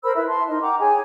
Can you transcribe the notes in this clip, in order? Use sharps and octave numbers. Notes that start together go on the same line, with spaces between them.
A#4 C5 B5 E6
E4 B4 E5
A5 C6
D#4 A#4 D#5
F#5 G5 A#5 D6
G#4 C#5 G5 G#5